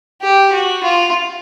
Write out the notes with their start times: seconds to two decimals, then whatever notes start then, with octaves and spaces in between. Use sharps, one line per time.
0.21 G4
0.52 F#4
0.84 F4